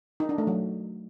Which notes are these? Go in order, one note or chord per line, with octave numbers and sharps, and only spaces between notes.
D#4
D4
A3
F#3